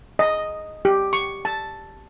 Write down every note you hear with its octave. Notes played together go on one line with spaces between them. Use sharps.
D#5
G4
C#6
A5